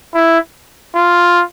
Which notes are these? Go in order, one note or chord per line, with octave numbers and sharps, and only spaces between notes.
E4
F4